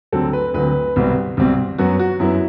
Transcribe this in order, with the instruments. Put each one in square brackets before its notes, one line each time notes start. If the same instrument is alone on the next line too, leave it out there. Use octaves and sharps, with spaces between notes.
[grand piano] D2 D3 F#3 C4 A4
B4
D2 D3 F#3 C4 B4
C2 B2 G3 C4
C2 B2 G3 C4
F#2 F#3 B3 F#4
F#4
F#2 F#3 B3 E4